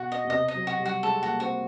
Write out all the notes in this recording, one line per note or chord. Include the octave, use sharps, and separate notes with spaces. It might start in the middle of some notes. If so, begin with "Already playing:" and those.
Already playing: B2 F#4
D#5
B2
C3 D#5
D#5
F#3
F#4
G3
F#4
G#3 A4
A#3 F#4
C4 F#4